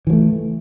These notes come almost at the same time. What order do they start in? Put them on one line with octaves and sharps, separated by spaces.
E3 F3 A3